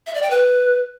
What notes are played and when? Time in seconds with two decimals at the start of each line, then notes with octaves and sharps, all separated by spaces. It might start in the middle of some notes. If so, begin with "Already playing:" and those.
0.07 E5
0.14 D5
0.22 G5
0.30 B4